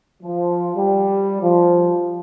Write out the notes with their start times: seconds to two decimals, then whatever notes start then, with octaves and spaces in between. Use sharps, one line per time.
0.23 F3
0.75 G3
1.42 F3